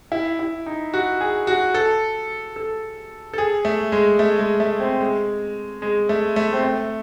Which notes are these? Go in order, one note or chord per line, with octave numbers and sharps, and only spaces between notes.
E4
E4
D#4
F#4
G#4
F#4
A4
A4
A4
G#4
A3
G#3
A3
G#3
A3
C4
G#3
G#3
A3
A3
C4
A3